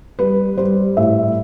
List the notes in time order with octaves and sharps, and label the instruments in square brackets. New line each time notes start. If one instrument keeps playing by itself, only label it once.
[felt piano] G3 B4
G3 C5
A2 E5